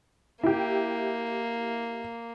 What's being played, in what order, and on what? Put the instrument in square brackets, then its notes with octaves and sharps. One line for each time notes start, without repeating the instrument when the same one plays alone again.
[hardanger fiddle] A#3 [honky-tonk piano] E4 G4